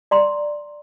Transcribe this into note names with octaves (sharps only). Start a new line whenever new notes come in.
D5 A#5 C6